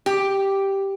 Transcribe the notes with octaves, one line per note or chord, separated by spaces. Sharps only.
G4